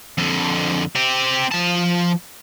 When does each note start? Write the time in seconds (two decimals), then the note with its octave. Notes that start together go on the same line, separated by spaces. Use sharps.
0.18 F2 D3
0.96 C4 G4
1.51 F3 A5